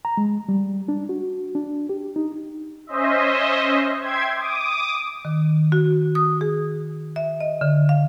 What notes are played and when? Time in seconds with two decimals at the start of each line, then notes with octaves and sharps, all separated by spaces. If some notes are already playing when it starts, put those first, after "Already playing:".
0.05 A#5
0.17 G#3
0.49 G3
0.88 D4
1.09 F#4
1.55 D4
1.89 G4
2.16 D#4
2.87 C#4 C5 D#5 E5
4.01 E5 G5 C6 G#6
4.35 D6 D#6
5.25 D#3
5.72 F#4
6.15 D#6
6.41 G#4
7.16 E5
7.40 D#5
7.61 D3
7.89 F5